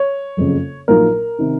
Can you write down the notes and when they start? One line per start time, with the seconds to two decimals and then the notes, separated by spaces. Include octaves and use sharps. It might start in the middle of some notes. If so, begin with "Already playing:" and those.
Already playing: C#5
0.37 F#1 F2 C#3
0.88 A#1 A#2 F#3 A#3 D#4 A#4
1.39 C3 D#3